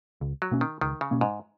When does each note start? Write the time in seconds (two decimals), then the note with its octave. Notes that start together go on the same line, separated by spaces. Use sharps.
0.21 C#2
0.42 F#3
0.51 B2 A#3 C#4
0.61 D#3
0.81 C#2 D#3
1.01 C#3
1.11 B2 A#3 C#4
1.21 G#2